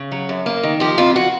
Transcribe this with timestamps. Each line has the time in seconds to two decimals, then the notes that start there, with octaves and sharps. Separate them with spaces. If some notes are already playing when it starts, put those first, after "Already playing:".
Already playing: C#3
0.12 F#3
0.29 F#2
0.46 A#3
0.63 D#3
0.80 F3 G4
0.98 F2 F4
1.16 F#4